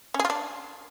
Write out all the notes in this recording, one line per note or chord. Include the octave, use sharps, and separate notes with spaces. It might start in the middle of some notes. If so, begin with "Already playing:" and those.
C#4
G#4
F4
D4